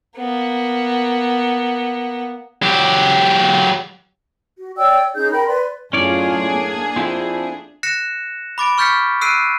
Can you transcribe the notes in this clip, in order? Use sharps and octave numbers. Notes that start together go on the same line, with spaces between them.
A#3 B3
F#3 G4
F#4
C#5 D5 G5 E6
C#4 D#4 G#4 G6
A#4 G5 B5
B4 D5 C6
F#2 A2 C#4 D4 F4 G#4 C#5 D5
A#3
F2 C4 E4
F#6 A#6 C#7 E7
B5 D6 A6 D7
C#6 F6 G6 A6 B6 C#7
E6 F#6 C7 D7 D#7